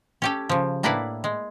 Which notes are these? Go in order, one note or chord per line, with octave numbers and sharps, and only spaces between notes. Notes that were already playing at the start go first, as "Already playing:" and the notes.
C#4 G4 A4
C#3 F3
A2 A#3 D4 E4 B4 D5
G#3